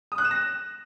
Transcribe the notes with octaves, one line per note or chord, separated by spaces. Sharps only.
D#6
F#6
E7
A#6